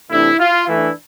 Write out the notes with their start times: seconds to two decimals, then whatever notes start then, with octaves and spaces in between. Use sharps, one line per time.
0.11 C3 E3 A3 D4 E4
0.40 F4
0.68 E3 A3 D4 E4